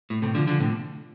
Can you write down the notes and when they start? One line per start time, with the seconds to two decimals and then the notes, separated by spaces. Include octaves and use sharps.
0.10 A2
0.22 A2 C3
0.35 D3 F3
0.47 D3 F3
0.60 A2 C3